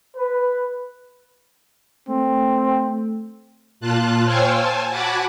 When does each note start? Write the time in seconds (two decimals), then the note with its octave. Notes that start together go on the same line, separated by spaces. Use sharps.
0.17 B4
2.09 A3 C4
3.80 A#2 F4 A5 F#6
4.25 C5 C#5 F5 G5 G#5 E6
4.56 G#5 A5
4.89 F#4 F#5 G#5 A5 B5 D6